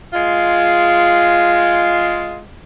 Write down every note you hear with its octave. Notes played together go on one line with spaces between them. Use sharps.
G#3 F4